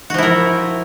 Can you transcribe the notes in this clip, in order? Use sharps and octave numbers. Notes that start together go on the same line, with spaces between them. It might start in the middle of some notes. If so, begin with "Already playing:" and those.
F3 E4 F#4 A#4